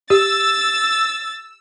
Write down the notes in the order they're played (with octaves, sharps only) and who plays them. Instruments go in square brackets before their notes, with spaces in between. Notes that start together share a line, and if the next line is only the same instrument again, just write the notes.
[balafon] G4 [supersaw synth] E6 [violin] A6